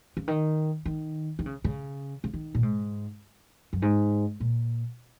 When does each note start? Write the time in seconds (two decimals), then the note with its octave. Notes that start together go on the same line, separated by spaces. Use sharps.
0.17 C#3
0.28 D#3
0.85 D#3
1.39 D#3
1.46 C#3
1.64 C#3
2.24 C#3
2.34 D#3
2.55 A#2
2.63 G#2
3.73 F#2
3.82 G#2
4.40 A#2